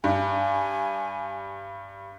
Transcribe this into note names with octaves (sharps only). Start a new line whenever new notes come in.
G2 G#5